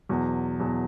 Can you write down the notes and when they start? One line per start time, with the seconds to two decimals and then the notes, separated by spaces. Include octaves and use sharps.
0.09 E2 B2 F#3
0.60 E2 B2 F#3